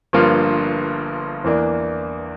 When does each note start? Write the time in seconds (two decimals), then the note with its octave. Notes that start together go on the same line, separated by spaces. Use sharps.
0.13 G1 G2 F3 A#3 F4
1.44 E2 E3 A#3 D4